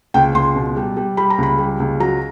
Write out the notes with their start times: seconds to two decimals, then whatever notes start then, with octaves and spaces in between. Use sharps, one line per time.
0.14 C#2 G5
0.35 C#2 C6
0.56 B2
0.76 G3
0.97 G3
1.17 G3 B5
1.30 A#5
1.38 C#2 B5
1.59 G3
1.80 C#2
2.00 F#3 A#5